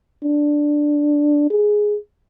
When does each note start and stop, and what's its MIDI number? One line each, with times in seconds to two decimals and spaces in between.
0.23 1.48 62
1.50 1.97 68